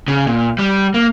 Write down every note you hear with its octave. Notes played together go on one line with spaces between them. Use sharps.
C#3
A#2
G3
A#3